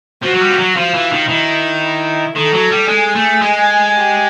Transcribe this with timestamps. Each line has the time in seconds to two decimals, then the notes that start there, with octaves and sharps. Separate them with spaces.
0.23 F3 F#4
0.34 F#3
0.40 G3
0.50 F3
0.59 F#3
0.76 F3 F4
0.94 E3
1.12 D#3
1.29 D#3 E4
1.82 E4
2.35 D#3 A4
2.54 F#3
2.71 G3
2.88 G#3 G#4
3.15 A3
3.41 G#3
3.94 G4